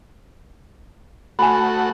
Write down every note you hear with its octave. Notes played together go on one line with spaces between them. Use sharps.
A3 F#4 G#5 B5